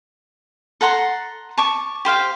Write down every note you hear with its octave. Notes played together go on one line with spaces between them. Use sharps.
A4 F#5 A#5 C6
A5 C#6 D6
G4 C5 F5 G5